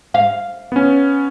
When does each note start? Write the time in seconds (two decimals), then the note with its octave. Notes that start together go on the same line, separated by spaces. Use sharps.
0.14 F5
0.72 B3 C#4